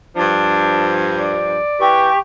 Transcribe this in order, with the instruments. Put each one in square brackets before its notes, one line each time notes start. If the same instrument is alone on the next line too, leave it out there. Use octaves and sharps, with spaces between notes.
[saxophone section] G2 F3 [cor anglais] D4
[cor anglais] D5
[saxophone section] E3 B4 [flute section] G4 C#6